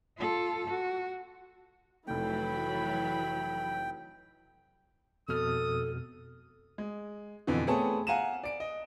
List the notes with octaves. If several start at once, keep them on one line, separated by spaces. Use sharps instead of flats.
F4 A4
F#4
F1 E3 F#3 A3 G5 B5
F2 B2 A4 D#6 F6
G#3
F2 B2 D3 E3
A3 B3 C4 G#4 C#5 A5
F5 F#5 G#5 A#5 D#7 E7
D5 D7
D#5